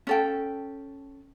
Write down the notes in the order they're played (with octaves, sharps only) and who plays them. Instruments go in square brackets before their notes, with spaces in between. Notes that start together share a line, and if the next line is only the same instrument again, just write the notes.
[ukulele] C#4 A4 G5